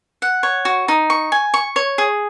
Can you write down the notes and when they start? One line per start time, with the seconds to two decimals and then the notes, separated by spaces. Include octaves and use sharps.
0.22 F#5
0.43 C#5
0.65 F#4
0.88 D#4
1.10 C#6
1.32 G#5
1.54 C#6
1.76 C#5
1.98 G#4